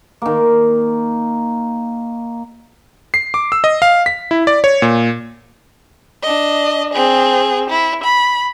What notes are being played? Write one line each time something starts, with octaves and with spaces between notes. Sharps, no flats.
D#3 A#3
C7
D6
E6
D#5
F5
B6
E4
D5
C#5
A#2
D4 D#5
C4 G#4
E4
B5